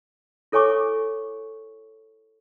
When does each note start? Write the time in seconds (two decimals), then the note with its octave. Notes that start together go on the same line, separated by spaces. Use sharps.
0.52 E4 A4 C#5 G#5 C#6 D6